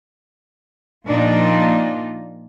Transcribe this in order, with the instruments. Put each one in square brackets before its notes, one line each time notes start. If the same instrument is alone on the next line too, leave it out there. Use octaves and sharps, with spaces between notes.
[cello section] A#2 F3 A#3 D4 D#4 F4